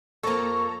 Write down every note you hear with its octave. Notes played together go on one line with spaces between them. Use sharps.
F2 A#3 A4 A#5 C#6